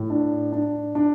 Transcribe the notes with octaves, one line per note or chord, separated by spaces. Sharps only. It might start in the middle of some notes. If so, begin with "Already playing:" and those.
Already playing: A2
D4
D4
D4